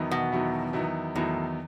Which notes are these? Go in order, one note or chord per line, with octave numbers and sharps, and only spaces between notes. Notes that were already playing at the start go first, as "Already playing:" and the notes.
Already playing: E2 D#3 F#3 B3 E4
B2
E2 D#3 F#3 B3 E4
E2 D#3 F#3 B3 E4
E2 A2 D#3 F#3 B3 E4